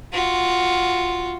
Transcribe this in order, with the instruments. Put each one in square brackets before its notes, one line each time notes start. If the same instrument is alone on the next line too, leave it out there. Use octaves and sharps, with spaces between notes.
[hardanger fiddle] F4 F#4